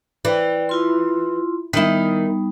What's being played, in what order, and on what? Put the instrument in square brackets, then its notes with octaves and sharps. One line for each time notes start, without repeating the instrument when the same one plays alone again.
[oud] E3 [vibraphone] D5 G5
[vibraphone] E4 F4 C6
[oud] D#3 E4 [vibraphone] G3 B3 D#4